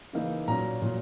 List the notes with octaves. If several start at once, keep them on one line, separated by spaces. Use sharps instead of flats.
C#3 E3 A#3 D#4
A#2 F#3 C#4 A#5
A#2 F#3 C#4